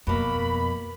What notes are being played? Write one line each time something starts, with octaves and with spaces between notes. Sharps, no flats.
F2 B2 A#3 B5